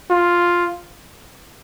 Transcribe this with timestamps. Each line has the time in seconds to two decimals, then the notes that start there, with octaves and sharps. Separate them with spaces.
0.11 F4